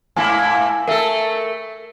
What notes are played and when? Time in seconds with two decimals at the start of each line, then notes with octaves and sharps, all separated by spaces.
0.17 G#2 A#3 E4 G#5
0.88 A3 A4 A#4 E5